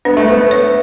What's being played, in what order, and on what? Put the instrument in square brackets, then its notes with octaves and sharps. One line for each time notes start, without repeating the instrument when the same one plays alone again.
[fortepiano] B3 [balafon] D4
[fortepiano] A3
[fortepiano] B3 [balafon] A4
[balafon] C#5